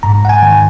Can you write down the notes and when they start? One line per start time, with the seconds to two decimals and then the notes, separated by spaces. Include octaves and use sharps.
0.03 G#2 A#5
0.23 G#2 F#5
0.29 G#5
0.43 D#3